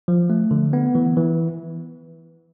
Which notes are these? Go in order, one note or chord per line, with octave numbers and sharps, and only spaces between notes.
F3
A3
D3
B3
E3
E3